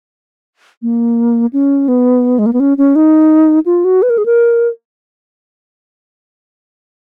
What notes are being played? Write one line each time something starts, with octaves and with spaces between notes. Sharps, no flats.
A#3
C#4
B3
G#3
A#3
B3
C#4
C#4
D#4
F4
F#4
B4
A#4
G#4
A#4